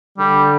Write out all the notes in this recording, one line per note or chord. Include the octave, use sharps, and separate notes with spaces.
D3 G3